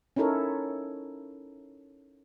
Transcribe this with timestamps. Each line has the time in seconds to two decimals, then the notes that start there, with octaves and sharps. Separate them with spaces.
0.16 C#4 D#4 E4 A4 A#4 C#5